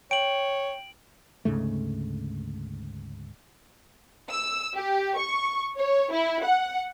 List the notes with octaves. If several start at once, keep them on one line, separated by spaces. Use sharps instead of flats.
C#5 G5 D7 F#7
D2 G#2 C#3 A3
E6
G4
C#6
C#5
E4
F#5